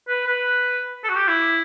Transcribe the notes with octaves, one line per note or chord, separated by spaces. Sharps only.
B4
B4
A4
F#4
G4
E4